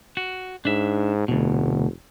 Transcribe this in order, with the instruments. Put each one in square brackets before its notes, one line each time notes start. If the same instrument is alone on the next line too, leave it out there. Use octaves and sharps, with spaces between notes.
[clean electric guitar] F#4
[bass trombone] G#2 [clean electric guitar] D4 E5
[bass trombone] F1 [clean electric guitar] D2 B2